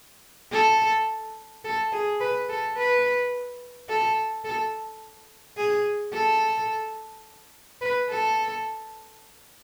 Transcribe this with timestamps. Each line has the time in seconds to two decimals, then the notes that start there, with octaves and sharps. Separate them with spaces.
0.53 A4
1.65 A4
1.92 G#4
2.20 B4
2.49 A4
2.77 B4
3.89 A4
4.45 A4
5.57 G#4
6.14 A4
7.81 B4
8.10 A4